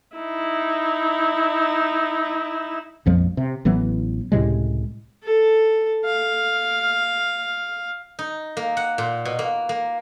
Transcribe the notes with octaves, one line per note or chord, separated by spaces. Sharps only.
D#4 E4
A#1 F2 F3 G#3
C3
A1 E3 F#3 B3
C#2 A2 C3 G#3
A4
F5
D#4
A#3
F#5
A#2
B2
A#3
A#3